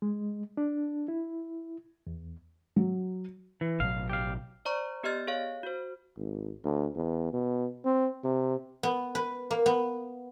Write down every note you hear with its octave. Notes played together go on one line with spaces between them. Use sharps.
G#3
D4
E4
E2
F#3
E3
A1 B2 F#3 F5
G4 F5
C5 D5 A#5 C#6
B3 G4 D5 D#5 F6 A6
G#4 C#5 F5
F#4 C5
G#1
D2
E2
B2
C4
C3
B3
B4
A#3
B3